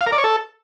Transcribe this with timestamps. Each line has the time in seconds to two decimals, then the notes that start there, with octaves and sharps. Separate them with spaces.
0.01 F5
0.07 A#4
0.12 D5
0.18 C#5
0.24 A4